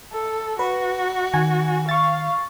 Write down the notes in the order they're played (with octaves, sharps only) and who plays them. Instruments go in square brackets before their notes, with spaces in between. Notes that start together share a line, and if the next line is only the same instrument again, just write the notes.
[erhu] A4
[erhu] F#4 [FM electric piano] B4
[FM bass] D#3 [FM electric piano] G#5
[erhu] F5 [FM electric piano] C#6 A6